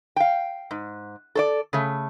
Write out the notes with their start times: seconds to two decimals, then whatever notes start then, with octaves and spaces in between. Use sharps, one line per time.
0.16 F5 G5
0.71 G#2
1.35 A4 C#5 D5
1.73 C#3 A3